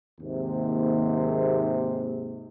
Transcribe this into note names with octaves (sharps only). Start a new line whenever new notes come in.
D#2 G#2 C3